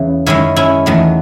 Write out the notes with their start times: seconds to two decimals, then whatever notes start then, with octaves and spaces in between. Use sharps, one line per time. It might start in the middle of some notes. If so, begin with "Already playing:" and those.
Already playing: E2 C#3 E3
0.26 F#2 D#3 G#3 C#4 E4
0.56 C#4 E4
0.86 E2 D#3 F#3 A3